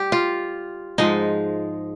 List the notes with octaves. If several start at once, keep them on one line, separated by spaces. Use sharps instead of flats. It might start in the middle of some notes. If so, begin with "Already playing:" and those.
Already playing: G3 G4
F4
G#2 F3 G#3 D#4